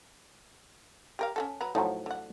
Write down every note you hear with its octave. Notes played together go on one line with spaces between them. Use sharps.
G4 A#4 F5
C#4 F#4 A4
F#3 B4 A#5
A2 F3 F#3 D#4 A4
D3 F#5